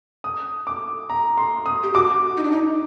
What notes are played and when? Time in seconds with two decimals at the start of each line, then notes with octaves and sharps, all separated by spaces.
0.24 D#6
0.67 D6
1.10 A#5
1.38 C6
1.66 D#6
1.83 G4
1.94 F#4 D6
2.37 D#4
2.44 D4
2.51 D#4